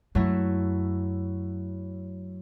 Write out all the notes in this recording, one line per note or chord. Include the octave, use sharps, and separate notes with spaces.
F#2 F#3 A3 E4